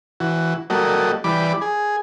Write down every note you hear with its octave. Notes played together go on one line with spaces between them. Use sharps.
E3 F#4
F#3 G3 A#3 F#4 A4 D#5
E3 G3 D5 B5 D6
G#4